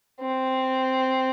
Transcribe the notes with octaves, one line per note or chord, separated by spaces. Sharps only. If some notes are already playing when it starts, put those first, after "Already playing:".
C4